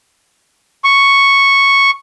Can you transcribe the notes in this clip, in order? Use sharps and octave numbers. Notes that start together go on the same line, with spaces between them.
C#6